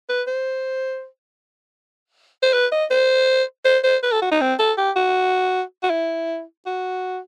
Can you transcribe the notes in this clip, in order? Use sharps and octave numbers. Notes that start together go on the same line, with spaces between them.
B4
C5
C5
B4
D#5
C5
C5
C5
B4
A4
F#4
D#4
C4
A4
G4
F#4
F#4
E4
F#4